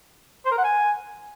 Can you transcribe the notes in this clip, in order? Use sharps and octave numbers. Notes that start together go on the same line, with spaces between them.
C5
A#4
F#5
G#5